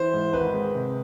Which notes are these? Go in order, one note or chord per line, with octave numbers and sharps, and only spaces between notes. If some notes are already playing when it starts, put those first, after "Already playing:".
Already playing: E3 C5
G#2
G#1 B4
G#3
C3